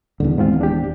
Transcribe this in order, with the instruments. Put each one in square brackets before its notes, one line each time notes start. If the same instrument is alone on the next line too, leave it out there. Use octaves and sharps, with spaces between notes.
[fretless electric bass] D#1 E2 [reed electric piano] D3
[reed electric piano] G#2 C4 F4
D4 G4